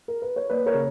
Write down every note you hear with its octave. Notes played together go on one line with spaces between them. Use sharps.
A#4
B4
C#5
A#3 B4 D5
A#4 C#5
C#3